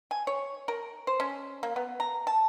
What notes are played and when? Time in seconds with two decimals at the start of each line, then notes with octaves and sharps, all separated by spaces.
0.11 G#5
0.27 C#5
0.68 A#4
1.07 C5
1.20 C#4
1.63 A#3
1.76 B3
2.00 A#5
2.27 A5